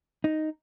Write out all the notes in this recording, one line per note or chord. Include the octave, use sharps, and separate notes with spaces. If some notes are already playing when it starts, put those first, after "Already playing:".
D#4